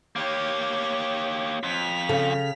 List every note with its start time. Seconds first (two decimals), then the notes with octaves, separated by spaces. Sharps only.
0.16 A#3 G4 C#5
1.63 F2 B6 F7
2.09 C#3 A4 G5